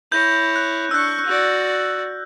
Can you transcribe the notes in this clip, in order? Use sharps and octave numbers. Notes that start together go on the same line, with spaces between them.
E4 C#5 G6 A#6
F#6
D4 C#6 E6 F#6
F#4 D5